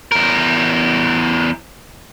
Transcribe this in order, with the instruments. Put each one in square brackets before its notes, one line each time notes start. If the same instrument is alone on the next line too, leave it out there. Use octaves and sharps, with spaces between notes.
[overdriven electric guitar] E2 A#4